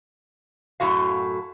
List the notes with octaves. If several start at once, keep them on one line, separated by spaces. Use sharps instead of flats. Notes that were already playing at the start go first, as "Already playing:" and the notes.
F#2 A2 F#4 F5